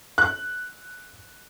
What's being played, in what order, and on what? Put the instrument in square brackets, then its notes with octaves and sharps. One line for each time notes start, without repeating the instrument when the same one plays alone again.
[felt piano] F#6